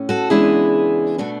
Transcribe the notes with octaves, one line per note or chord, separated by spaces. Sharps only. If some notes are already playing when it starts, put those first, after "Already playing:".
Already playing: A2 C#4
F#4 A4
E2 C#3 G#3 B3 D4 E4 G#4
B2 A3 D4 F#4